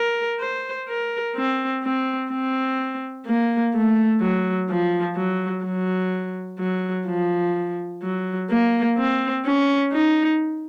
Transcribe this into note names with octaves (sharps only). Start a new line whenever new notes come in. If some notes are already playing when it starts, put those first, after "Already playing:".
Already playing: A#4
C5
A#4
C4
C4
C4
A#3
A3
F#3
F3
F#3
F#3
F#3
F3
F#3
A#3
C4
C#4
D#4